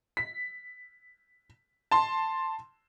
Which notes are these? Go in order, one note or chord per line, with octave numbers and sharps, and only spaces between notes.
B6
A5 C6